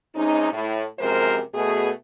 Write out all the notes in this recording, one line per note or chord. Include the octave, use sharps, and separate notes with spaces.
C3 G#3 C#4 D#4
A2
F#2 C3 F3 G#3 A#4 C5
B2 A3 G#4